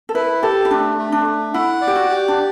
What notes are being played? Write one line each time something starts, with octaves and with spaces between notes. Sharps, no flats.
A4
E4 B4
G4 A4
E4
A3 D4
A3
D4
A3
E4 F#5
D5
G4
F#4
G4
D4